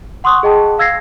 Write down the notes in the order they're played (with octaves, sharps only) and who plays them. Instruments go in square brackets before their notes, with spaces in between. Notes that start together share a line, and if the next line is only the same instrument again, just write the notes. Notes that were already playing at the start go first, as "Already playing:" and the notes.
[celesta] F#5 C6 C#6 D#6 F#6
G#4 D#5 G5 A5
F5 E6 G#6 A#6 C7